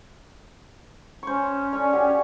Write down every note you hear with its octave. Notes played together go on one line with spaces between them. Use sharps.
C#4 C5 C#5
D4 A4 C#5
F#4 G4